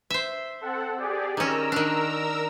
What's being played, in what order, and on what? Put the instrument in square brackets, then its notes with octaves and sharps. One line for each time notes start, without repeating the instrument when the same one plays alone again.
[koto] C5 E5
[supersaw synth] C4 A4 F#5
G4 G#4 D5
[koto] D#3 C#4 [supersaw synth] A#4 A#5 E6
[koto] D#3 D4